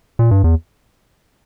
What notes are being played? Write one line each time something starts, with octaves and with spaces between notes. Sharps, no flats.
A#2
G2
E2